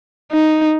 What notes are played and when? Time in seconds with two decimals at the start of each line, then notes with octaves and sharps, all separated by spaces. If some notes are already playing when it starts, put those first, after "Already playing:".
0.32 D#4